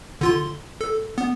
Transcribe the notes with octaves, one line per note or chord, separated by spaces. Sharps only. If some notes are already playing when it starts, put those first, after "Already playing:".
D3 F4 C6
A4
B3